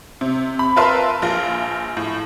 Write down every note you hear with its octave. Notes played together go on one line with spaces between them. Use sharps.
C3
B5
F4 A#4 B4 E5 A5 C6
A#1 F4
A2